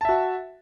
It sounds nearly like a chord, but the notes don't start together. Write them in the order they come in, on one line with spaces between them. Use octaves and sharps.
A5 E5 F#4